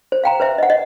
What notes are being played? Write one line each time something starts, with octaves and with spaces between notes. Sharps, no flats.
C5
F5 G5 A#5
B4 C5 E5
D#5 F#5
D#5